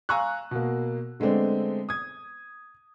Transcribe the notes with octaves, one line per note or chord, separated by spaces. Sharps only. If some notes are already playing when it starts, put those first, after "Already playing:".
F5 G#5 A#5 C#6 E6 F#6
B2 A#3
D3 G#3 A3 B3 C4 D5
D#6 G#6